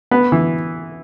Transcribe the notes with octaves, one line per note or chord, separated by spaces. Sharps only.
B3
E3